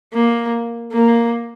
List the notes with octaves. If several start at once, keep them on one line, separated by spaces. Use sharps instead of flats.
A#3
A#3